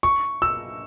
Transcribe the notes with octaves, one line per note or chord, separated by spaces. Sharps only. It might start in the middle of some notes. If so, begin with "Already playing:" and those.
C#6
E6